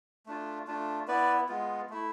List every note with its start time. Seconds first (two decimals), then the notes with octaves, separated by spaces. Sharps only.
0.26 A3 D4 F4
0.67 A3 D4 F4
1.08 B3 E4 B4 D5
1.48 G#3 B3 F4
1.90 A3 E4